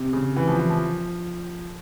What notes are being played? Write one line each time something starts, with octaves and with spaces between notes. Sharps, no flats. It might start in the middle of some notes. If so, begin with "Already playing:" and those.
Already playing: C3
C#3
E3
F3
E3
F3